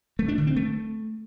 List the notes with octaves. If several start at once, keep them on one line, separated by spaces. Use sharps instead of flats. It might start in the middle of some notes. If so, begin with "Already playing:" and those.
A3
D4
D3
C4
A3